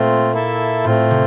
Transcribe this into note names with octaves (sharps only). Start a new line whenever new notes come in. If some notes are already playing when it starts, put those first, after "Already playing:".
Already playing: A#2 A3 C4 F4
A#3 E4 A4 E5 A5
A2 A3 C4 F4
C3